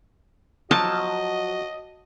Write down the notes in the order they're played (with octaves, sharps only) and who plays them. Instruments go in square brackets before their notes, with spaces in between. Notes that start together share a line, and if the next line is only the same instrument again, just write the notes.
[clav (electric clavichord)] F3 F#3 [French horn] F#4 [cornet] D#5 [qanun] A5